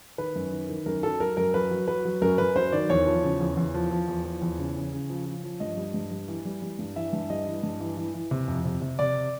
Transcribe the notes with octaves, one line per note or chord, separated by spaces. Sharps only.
D#3 B4
F#2
D#3
D#3
F#2 A#4
F#3 A4
F#3 A#4
F#2 A#4
F#3 B4
F#3
F#3 B4
F#3
F#2 A#4
F#2 B4
F#3 C5
D#3 D5
E2 C#5
F3
C#3
E2
E2
F3
F3
E2
F3
E2
C#3
C#3
C#3
F3
F3
F3
G2 D#5
G3
G2
G3
E3
G3
G3
G2
E3 E5
G2
G3 D#5
E3
G2
E3
E3
E3
C3
F2
C3
C3
C3 D5